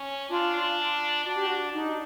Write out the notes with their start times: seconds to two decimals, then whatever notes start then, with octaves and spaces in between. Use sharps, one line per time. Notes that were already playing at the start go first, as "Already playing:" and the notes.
Already playing: C#4
0.30 D4 F4
1.25 D4 F#4
1.36 G4
1.47 F#4
1.72 D4 D#4